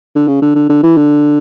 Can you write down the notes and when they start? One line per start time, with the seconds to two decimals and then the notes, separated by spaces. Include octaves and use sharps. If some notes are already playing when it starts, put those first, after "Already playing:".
0.15 D3
0.28 C#3
0.42 D3
0.55 D3
0.69 D3
0.83 E3
0.97 D3